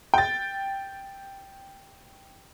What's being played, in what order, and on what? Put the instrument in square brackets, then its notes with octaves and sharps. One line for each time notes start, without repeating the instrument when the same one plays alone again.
[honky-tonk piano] G5 A6